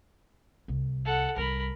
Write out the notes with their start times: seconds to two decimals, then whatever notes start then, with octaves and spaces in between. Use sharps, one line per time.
0.68 C2
1.05 A4 F#5
1.37 C2 G3 A#4 B5